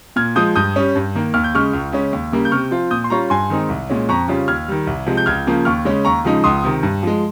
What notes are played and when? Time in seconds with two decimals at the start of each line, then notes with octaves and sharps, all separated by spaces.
0.16 A#2 F6 G#6
0.36 F3 G#3 D#6 G6
0.56 G2 D#6 G6
0.76 G3 C#4
0.96 G2
1.15 D#3 A#3
1.34 D#2 F6
1.44 G6
1.54 C#3 G#3 C#6 F6
1.73 C#2
1.92 C#3 G#3 C#4
2.13 D#2
2.32 C#3 G3 A#3
2.45 G6
2.51 C3 C#6 F6
2.71 F3 C4 F4
2.91 A#2 D#6 G6
3.04 C6
3.10 G3 C#4 F4 A#5 C#6
3.30 G2 G#5 C6
3.50 D#3 G#3 C4 D#4
3.69 C2
3.90 A#2 G#3 C#4
4.09 F2 A#5 C#6
4.28 C#3 G3 C#4 F4
4.48 D#2 F6 G#6
4.68 D#3 G3
4.87 C2
5.06 C3 F3 G#3
5.17 G6
5.26 C#2 F6 G#6
5.47 C#3 F3 A#3
5.65 D#2 C#6 F6
5.85 C#3 G#3 C#4
6.05 D#2 A#5 C#6
6.24 C#3 F3 G#3 D#4
6.44 C#2 C6 D#6
6.64 C3 D#3
6.83 G2
7.03 F3 G#3